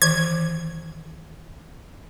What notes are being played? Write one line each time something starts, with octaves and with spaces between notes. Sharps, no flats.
D#3 E3 G#6